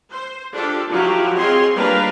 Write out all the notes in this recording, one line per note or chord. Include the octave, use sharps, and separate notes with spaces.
C5
D4 F4 G4 A4
F3 F#3 E4 F#4 G4
C4 F4 G#4 C#5 D#5 C6
G3 A#3 D4 A#4 B4 F5